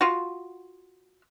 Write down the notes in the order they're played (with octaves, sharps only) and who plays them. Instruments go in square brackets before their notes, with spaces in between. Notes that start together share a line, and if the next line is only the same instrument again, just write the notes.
[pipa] F4 F#4